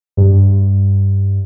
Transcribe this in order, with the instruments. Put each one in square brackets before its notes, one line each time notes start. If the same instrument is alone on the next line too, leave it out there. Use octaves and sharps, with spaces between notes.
[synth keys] G2